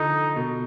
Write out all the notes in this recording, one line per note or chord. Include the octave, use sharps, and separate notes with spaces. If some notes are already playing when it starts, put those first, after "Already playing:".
Already playing: D3 F3 D#4
B2